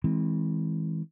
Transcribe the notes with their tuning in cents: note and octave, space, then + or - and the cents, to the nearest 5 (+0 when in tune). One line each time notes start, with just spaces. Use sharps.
E3 -35 G#3 +0 C4 +0